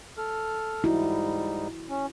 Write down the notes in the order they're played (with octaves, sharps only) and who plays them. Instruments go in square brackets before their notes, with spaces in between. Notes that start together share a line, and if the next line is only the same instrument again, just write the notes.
[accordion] A4 F6
[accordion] G#2 G3 D#4 [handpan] E4 F#4
[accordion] C#4